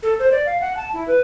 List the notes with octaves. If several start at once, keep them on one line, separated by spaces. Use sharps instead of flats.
A4
C5
D5
F5
F#5
A5
E4
B4